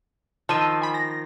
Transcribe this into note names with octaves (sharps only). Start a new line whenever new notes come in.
D#3 F3 A5 E6 D#7
G#5 B5
A#6